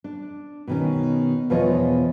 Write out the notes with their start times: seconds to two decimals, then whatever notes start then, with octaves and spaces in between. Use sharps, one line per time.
0.04 D4
0.67 B2 D#3 C#4
1.50 E2 B2 F3 F4 C#5 D#5